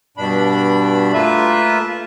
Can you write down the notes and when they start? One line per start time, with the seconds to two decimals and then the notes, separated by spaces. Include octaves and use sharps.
0.17 G2 B2 D4 B5
1.13 A3 A#3 F4 B4 E5